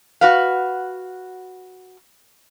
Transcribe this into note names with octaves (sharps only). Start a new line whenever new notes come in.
F#4 B4 F5